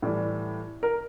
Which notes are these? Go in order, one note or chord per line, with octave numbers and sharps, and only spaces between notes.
A2 E3 G3
A#4